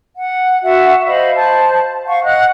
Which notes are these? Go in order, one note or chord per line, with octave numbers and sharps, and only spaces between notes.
F#5
F#4 E5 F#5
C5 D#5 F5 B5
C5 A5
F5 F#5 C#6
D#5 F#5 F#6